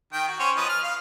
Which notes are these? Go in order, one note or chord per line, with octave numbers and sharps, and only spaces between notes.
D#3 G5
F#4
C#4 C5 C#5
F3 B4 D#5
F6
F5